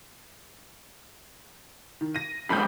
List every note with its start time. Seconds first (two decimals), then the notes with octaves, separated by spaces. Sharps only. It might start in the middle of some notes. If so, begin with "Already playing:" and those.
2.01 D#3
2.15 A#6 D#7
2.50 F2 G#2 B5 G6